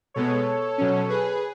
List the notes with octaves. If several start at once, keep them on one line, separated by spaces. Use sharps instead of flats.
B2 G#3 B3 A4 C#5
B2 F#3 C#4
G#4 B4